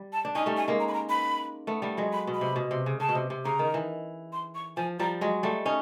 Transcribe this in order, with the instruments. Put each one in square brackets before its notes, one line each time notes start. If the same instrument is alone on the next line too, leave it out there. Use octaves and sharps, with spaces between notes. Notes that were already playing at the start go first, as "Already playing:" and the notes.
Already playing: [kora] G3
[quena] A5
[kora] D4
[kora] C#4 D#4 [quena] G#5
[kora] G3 A3
[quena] G#5
[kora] G#3 A#3
[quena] A#5
B5
A#5
B5
[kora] A3 B3
G3 A3
F#3 G#3
[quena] B5
[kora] B2
[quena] B5
[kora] C3
B2
C3
C#3
[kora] C#3 [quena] A5
[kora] B2
C3
C3
[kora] C#3 [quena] A#5
[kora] D#3
E3
[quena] C6
C#6
[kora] F3 [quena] G#5
[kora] F3 G3 [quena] A#5
[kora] F#3 G#3
G3 A3
C#4 D#4